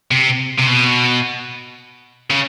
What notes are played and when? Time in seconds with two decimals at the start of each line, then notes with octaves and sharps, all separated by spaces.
0.11 C3
0.59 C3
0.68 B2
2.30 C#3